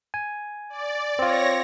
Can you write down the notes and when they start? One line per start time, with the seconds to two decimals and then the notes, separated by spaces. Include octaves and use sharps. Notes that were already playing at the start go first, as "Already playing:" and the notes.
0.14 G#5
0.70 D5
1.19 C4 F4 C#5 A#6